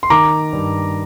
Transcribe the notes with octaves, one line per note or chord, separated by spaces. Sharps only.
C6
D#3 A#5 D6
G2